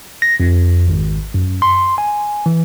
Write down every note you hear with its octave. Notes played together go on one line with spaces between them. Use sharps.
A#6
F2
G#1
F#2
C6
G#5
E3